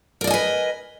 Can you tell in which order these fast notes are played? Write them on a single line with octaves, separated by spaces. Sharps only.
A#4 D5 D#5 G#5 B4